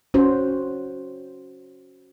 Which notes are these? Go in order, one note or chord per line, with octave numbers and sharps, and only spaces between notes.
C#4 F#4 C5